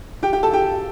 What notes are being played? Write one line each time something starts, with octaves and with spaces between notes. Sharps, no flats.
G4 G5
G4 G5
A4 A5
G4 G5